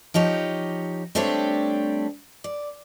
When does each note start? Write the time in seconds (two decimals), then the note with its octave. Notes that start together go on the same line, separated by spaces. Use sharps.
0.14 F3 D#4 G4 C#5
1.15 G3 A3 C4 D4 G4 C#5
2.44 D5